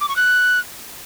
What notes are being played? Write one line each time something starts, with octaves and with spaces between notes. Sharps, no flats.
D6
C#6
F#6